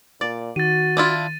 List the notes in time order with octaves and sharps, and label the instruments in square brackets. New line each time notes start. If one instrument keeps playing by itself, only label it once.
[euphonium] A#2 [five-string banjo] D5
[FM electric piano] D#3 [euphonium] F#4 [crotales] A6 D#7
[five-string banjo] D4 E4 F4